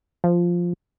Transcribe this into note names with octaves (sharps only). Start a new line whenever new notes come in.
F3